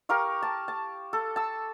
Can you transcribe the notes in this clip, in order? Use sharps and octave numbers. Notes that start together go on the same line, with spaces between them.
G4 A#4 F5 C#6
A5
A5
A4
A5 E6